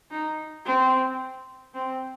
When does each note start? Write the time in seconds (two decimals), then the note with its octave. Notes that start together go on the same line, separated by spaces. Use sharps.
0.11 D#4
0.66 C4
1.74 C4